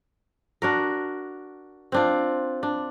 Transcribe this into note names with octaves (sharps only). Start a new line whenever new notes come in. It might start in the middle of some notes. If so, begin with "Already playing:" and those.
D4 F#4 A#4
C4 D4 F4
D4